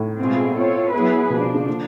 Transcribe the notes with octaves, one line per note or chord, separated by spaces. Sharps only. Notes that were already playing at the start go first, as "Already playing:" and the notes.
Already playing: A2
B2 G#3 C4 F4 G#4
C4 F4 A4 C#5
F#3 B3 E4 G#4 B4
B2 F3 A#3 D4
B2
C#3
D3